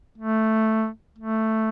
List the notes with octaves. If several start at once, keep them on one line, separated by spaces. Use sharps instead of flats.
A3
A3